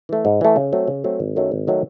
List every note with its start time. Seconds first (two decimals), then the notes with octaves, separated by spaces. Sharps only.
0.09 E3 A3
0.25 G#2
0.41 E3 A3
0.56 C#3
0.73 F#3 A3 C4
0.88 C#3
1.04 F#3 A3 C4
1.20 G#1
1.36 F#2 D#3 F#3 A3
1.52 G#1
1.67 D#3 F#3 A3